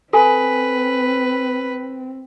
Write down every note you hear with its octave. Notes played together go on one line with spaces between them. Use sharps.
C4 A4 B4 G#5